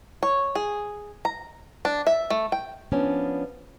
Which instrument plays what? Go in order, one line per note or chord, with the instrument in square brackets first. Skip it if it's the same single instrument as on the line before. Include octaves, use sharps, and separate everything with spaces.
[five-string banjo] C#5
G#4
A#5
D4
E5
A3
G5
[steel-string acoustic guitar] F3 B3 C#4 D4